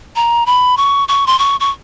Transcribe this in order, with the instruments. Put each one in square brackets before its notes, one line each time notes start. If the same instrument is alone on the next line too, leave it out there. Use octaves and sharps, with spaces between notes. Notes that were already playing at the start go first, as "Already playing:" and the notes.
[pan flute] A#5
B5
C#6
C#6
C6
C#6
C#6